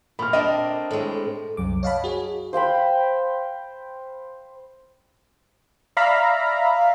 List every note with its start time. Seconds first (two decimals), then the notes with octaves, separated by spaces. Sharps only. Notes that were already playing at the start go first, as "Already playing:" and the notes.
0.19 A#2 B5 F6
0.33 C4 D4 A#4 D#5
0.91 A2 G#3
1.57 C2 F#2 D6
1.83 C#5 D#5 F5 F#5 A5 B5
2.04 F#4 G#4 C#5
2.53 C5 F5 G5 B5
5.97 D5 E5 F5 A#5 B5